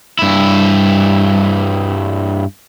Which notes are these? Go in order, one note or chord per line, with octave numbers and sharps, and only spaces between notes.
G2 E4